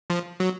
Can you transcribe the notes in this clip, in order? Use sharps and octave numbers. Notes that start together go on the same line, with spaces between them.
F3
F#3